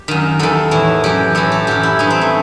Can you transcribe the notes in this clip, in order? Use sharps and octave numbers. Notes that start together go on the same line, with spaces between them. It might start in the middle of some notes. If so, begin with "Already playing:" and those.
Already playing: G4
F#2 D#3
E2 D#3 A4
A2 E3
F#2 E3 G4
A2 E3 A4
G4
F#2 E3 G4
E4
G2 E3 D#4
C4
A3